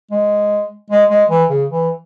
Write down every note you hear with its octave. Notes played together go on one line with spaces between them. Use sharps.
G#3
G#3
G#3
E3
C#3
E3